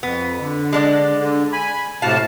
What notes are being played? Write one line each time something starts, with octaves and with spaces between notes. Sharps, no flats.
F2 B3
D3
G#3 D4 D5
D3
G#5 B5
A2 C3 F#4 F5 A5